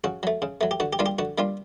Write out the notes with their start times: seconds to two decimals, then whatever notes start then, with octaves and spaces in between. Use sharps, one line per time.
0.04 C#3 F#4
0.23 F#3 A3
0.42 C#3
0.61 F#3 A3
0.71 G4
0.80 D3 F#4
0.93 G4
0.99 G3 A#3 D4 F4
1.06 G4
1.19 D3 F#4
1.38 G3 A#3 D4 F4